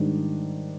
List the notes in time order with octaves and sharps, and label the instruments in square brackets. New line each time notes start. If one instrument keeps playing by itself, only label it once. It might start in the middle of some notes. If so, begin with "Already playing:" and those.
Already playing: [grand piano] G#2 D#3 G3 D4